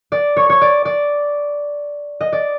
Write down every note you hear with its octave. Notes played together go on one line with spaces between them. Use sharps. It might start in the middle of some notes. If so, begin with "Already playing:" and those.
D5
C#5
C#5
D5
D5
D#5
D5